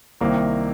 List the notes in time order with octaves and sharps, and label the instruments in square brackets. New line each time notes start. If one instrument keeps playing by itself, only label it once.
[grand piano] C2 C3 D#3 A#3